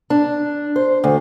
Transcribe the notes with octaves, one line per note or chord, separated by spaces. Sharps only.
D4
C5
D2